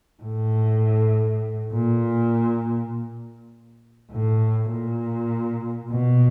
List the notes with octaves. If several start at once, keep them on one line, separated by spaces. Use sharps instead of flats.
A2
A#2
A2
A#2
B2